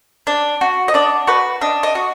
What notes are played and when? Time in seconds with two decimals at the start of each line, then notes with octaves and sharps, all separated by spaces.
0.27 D4
0.61 F#4
0.88 D#5
0.94 D4 D5
1.27 F#4 B4
1.61 D4 D#5
1.83 D#5
1.95 F#4